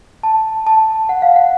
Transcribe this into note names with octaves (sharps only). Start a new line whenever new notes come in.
A5
A5
F#5
F5
F#5